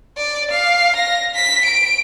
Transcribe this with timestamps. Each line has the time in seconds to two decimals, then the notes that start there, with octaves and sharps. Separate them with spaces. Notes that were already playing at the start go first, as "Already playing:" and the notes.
0.18 D5
0.51 F5
0.96 A#6
1.35 B6
1.65 D7